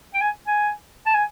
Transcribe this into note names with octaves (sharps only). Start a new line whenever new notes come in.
G5
G#5
G#5
A5
G#5